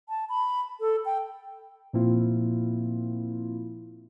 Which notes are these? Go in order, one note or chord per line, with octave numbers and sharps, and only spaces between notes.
A5
B5
A4
G5
A#2 F3 A#3 C4 E4 F4